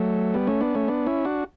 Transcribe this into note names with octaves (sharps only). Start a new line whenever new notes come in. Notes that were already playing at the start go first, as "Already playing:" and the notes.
Already playing: F#3 A3
G3 B3
A3 C#4
B3 D4
A3 C#4
B3 D4
C#4 E4
D4 F#4